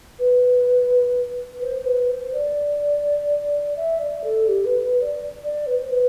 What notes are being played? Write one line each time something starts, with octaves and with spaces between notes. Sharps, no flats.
B4
C5
C5
B4
C5
D5
E5
D5
A4
G4
B4
B4
D5
D5
B4
C5
B4